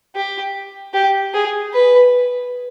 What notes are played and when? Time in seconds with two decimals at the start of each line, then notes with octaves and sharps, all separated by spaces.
0.15 G4
0.94 G4
1.34 G#4
1.73 B4